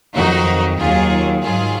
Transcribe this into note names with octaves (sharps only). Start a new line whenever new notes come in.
F2 D#3 F#3 D#4 F#4
D#2 D#3 F#3 F4 G#4
G#2 D#3 F#3 F4 G#4